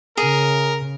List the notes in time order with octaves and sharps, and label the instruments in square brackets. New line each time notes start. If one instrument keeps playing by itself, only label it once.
[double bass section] C#3 [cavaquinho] G#4 [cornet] A#4